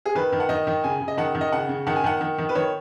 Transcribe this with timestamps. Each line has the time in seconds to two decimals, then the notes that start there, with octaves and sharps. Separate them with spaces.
0.05 G#4
0.15 D#3 B4
0.32 D#3
0.40 F#5
0.49 D#3 D#5
0.67 D#3
0.84 C#3 G#5
1.01 C#3
1.08 D#5
1.18 D#3 F#5
1.35 D#3
1.41 D#5
1.52 C#3 F#5
1.69 C#3
1.87 D#3 F#5
1.96 G#5
2.04 D#3 F#5
2.21 D#3
2.38 D#3
2.49 B4
2.55 D#3 C#5